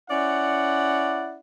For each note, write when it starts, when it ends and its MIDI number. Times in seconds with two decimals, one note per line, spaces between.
0.10 1.39 61
0.10 1.39 64
0.10 1.39 74
0.10 1.39 78